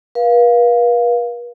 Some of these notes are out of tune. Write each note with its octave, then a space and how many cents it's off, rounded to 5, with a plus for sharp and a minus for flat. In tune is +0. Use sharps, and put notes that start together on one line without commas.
B4 -45 F5 +0